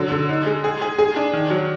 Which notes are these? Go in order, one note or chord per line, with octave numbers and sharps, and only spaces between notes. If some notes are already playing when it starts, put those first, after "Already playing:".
Already playing: D3 F#3
D3
D#4
G#3
G#4
G#4
G#4
D4
D#3
F#3